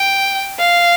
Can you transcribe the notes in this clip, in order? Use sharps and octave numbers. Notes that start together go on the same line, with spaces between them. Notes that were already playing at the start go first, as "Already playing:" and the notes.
Already playing: G5
F5